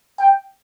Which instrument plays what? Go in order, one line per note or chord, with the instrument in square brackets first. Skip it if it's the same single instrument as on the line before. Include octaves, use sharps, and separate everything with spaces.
[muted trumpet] G5